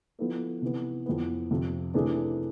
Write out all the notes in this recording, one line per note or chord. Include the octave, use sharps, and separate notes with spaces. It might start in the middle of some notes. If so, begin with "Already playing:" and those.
F3 B3 E4 A4
C3 E3 B3
F2 E3 B3
F2 C3 F3
C3 E3 A3 D4 G#4